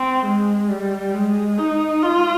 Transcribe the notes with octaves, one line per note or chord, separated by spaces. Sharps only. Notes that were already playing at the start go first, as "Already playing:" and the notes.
Already playing: C4
G#3
G3
G#3
D#4
F4